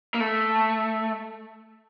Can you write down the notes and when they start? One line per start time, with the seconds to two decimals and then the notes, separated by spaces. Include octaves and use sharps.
0.14 A#3
0.20 A3